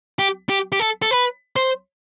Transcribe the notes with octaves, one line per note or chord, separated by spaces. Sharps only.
G4
G4
G4
A4
A4
B4
C5